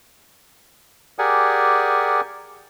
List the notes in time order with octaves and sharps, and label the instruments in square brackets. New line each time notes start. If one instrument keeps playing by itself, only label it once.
[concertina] G4 G#4 A#4 D5 F#5 G#5